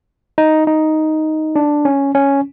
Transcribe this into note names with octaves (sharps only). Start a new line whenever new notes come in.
D#4
D#4
D4
C#4
C#4